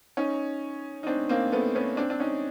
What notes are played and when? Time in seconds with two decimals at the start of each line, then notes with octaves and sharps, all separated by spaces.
0.17 C#4 D#4
1.03 D#4
1.07 C4 D4
1.29 A#3 C4
1.52 A3 B3
1.75 B3 C#4
1.97 C4 D4
2.10 D4
2.20 C#4 D#4